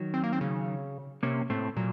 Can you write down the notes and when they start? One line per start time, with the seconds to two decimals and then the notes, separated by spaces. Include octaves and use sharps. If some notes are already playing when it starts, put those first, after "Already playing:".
Already playing: D#3 F#3
0.14 C4
0.24 A#3
0.33 C4
0.41 C#3
1.23 C3 A#3 C#4
1.50 A2 A3 C4
1.76 A#2 F#3